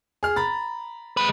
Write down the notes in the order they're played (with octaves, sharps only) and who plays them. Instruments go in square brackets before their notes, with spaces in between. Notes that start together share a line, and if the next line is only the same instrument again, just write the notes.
[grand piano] G#4 F6
A#5 B5 A6
[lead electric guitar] G#3 B4